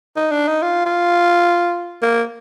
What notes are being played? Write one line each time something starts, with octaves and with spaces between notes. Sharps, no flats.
D#4
D4
D#4
F4
F4
A#3